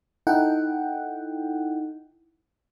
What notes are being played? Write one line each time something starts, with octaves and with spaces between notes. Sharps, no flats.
D#4 E4 A4 F#5 G5